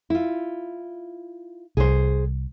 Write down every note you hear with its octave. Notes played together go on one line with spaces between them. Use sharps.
E4 F4
C2 G#4 C5